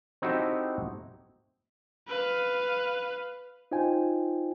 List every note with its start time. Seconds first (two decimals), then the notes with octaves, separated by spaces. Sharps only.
0.22 C4 D#4 E4 F#4 G4 A4
2.08 B4 F5
3.71 D#4 F4 C5 G5 G#5